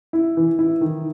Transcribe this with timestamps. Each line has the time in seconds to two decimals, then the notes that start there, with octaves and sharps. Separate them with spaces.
0.13 E4
0.37 E3
0.59 E4
0.81 D#3